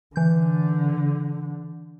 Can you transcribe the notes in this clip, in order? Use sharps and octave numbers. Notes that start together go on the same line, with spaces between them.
D3 E3 G6